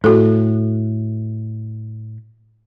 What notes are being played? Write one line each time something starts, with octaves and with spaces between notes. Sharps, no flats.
A2 F#4 A4